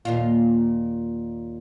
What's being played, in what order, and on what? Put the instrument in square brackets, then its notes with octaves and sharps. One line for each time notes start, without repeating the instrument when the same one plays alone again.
[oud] D#2 A#2 F4